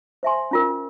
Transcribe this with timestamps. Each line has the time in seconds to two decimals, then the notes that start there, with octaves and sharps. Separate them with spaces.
0.23 C5 E5 G#5 C6
0.51 C#4 F4 A#4